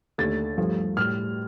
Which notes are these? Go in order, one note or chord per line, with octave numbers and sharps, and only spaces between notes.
D#2 D3 A3 A6
G2 F3 A3
A2 G3 F6